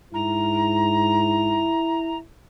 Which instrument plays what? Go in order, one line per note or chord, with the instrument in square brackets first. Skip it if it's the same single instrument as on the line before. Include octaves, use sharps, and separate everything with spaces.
[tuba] G#2 [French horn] E4 [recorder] A#5